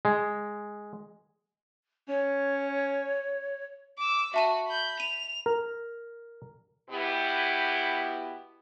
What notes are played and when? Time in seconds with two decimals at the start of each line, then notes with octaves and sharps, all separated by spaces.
0.05 G#3
2.09 C#4 C#5
3.98 D6 E6
4.34 F#4 E5 A5 D#7
4.67 B5 G6
5.00 D#7 F7
5.46 A#4
6.90 B2 B3 E4 G4